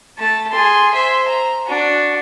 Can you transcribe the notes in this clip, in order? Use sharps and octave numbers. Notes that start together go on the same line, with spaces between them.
A3 A5
G#4 C6
C5 E5
A#5
D4 F#4